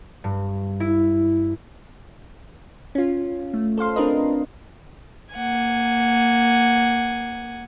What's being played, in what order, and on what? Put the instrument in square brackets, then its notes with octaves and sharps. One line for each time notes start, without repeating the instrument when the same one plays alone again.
[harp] G2
E4
[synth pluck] C#4 F4
A3
A4 C5 F5 C6
C4 D4 A#4 B4 D#5
[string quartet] A#3 F#5 G#5